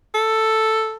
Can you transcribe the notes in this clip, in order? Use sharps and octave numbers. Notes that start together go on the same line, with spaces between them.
A4